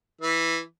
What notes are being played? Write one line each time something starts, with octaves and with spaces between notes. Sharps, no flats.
E3